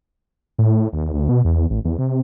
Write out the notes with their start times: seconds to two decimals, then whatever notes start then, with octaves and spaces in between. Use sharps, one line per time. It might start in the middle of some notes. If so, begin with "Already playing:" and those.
0.58 A2
0.93 D#2
1.14 D2
1.29 B2
1.45 E2
1.70 A1
1.85 E2
1.98 C3